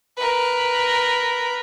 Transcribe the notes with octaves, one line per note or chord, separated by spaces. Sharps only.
A#4 B4